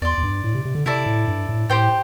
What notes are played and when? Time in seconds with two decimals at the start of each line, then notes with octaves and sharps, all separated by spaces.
0.02 E2 D5 C6
0.18 E2
0.23 G2
0.44 A2
0.55 C3
0.65 C3
0.75 D3
0.86 C3 E4 A4 D5
1.06 A2
1.28 G2
1.49 A2
1.70 A2 G4 C5 G5